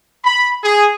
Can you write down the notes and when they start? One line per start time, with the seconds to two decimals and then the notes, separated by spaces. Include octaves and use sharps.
0.24 B5
0.64 G#4